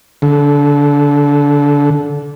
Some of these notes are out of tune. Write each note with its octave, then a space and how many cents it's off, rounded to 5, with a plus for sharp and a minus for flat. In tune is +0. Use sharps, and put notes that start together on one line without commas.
D3 -25